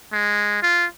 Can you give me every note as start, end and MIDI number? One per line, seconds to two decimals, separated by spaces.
0.13 0.59 56
0.63 0.86 65